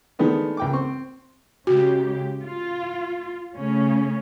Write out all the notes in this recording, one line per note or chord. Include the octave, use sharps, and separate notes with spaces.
D#3 G#3 A3 B3 D4
C#2 G5 D6
C4 C#6
C#3 G#3 F#4 G4
F4
C#3 A3 C#4